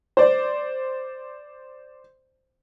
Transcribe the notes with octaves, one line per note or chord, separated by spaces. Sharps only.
C5 D5